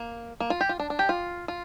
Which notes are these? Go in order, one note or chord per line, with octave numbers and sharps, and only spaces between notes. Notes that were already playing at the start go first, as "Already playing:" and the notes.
Already playing: A#3
A#3
F4
G4
F4
D4
D4
G4
F4
F4